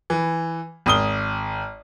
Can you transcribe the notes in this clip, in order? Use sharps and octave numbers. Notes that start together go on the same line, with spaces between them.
E3
G#1 D#6 G7